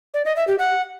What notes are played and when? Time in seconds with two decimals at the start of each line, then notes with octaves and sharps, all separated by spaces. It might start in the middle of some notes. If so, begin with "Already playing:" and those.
0.14 D5
0.25 D#5
0.36 E5
0.48 G4
0.59 F#5